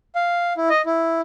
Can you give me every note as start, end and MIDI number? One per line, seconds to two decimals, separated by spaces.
0.15 0.53 77
0.57 0.69 64
0.70 0.82 75
0.86 1.21 64